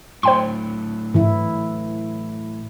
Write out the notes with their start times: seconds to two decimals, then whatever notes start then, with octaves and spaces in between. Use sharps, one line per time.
0.23 A2 F#3 C5 G5 C6
1.14 G#2 E3 E4